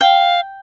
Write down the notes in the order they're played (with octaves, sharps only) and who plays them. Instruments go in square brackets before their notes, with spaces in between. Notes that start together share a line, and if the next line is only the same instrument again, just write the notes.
[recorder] F5 [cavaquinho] G5